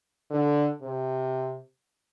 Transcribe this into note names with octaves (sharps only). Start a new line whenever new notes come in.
D3
C3